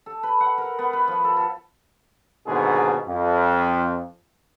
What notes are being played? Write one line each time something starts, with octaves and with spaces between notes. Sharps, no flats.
A4
B4
F#5
A#4
B3
B4
F3
A4
A4
D#2 G#2 B2 D3 G#3 G#4
F2